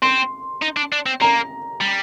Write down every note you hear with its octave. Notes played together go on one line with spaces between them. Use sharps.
C4 C6
D#4
D4
D4
C4
A#3 A#5
G3